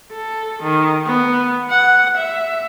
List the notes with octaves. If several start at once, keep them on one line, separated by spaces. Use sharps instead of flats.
A4
D#3
B3
F#5
E5